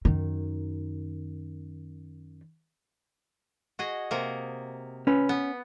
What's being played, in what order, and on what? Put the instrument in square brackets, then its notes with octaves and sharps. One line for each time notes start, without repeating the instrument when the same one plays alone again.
[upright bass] F#2 D#3
[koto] F#4 G#4 D#5
C3 A#3
[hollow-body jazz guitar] C#4 B4
[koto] B3